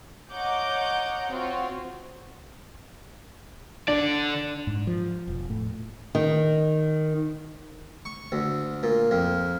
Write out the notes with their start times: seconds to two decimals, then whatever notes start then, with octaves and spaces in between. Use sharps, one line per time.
0.31 C#5 D#5 F#5 A#5 D6 G6
1.29 C4 F4 F#4 C#5
3.88 D3 D4 D5
4.67 G#2
4.87 F3
5.28 E1
5.50 A2
6.15 D#3
8.05 C#6
8.32 D2
8.83 A#2
9.11 F2